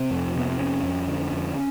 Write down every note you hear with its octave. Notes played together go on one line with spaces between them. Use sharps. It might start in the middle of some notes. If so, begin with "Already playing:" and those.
Already playing: C3 C4
F2
C3 B3
C4
F2 C#4
F2
D3
F2